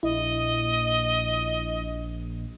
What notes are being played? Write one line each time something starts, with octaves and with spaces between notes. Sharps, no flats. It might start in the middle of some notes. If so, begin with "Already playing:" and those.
A#1 E4 D#5